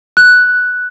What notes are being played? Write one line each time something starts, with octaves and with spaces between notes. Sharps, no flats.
F#6